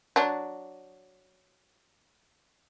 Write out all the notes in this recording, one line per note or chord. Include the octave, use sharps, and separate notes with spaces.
F#3 D4